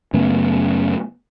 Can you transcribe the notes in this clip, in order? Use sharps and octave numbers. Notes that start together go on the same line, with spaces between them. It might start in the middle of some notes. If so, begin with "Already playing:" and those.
F#2 C#3 A3 B3